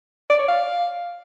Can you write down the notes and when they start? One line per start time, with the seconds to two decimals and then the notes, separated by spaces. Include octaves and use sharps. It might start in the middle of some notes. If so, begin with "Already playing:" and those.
0.30 D5
0.39 C#5
0.48 F5